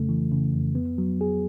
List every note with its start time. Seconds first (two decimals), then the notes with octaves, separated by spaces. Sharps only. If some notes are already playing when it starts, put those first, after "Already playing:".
Already playing: F2 C#3 A3
0.09 E3
0.31 C#3
0.53 F2
0.75 B3
0.98 F#3
1.21 G#4